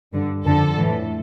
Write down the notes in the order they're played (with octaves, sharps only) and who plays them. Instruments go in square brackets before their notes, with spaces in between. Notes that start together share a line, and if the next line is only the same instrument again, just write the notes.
[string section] G2 D3
F2 D3 A4
A2 E3